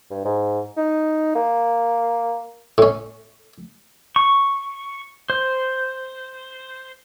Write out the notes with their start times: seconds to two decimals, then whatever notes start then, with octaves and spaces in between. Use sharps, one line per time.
0.11 G2
0.25 G#2
0.77 D#4
1.35 A#3
2.78 A2 C#4
4.16 C#6
5.30 C5